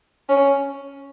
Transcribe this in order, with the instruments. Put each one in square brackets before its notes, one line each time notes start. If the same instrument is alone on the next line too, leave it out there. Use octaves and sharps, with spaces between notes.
[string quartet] C#4